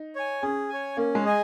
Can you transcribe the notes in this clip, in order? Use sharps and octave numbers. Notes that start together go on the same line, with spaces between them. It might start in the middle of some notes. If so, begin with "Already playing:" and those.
Already playing: D#4
C#5 G#5
C#4 G#4
C#5 G#5
A#3 C#4
G#3
G#4 D#5 G#5